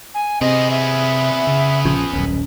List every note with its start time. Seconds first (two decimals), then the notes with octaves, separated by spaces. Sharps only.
0.14 G#5
0.41 C3 B3 C4 G#4 D#5
0.71 E5
1.47 C#3
1.85 A#1 F3 C#4
2.13 D#1 B1 C#4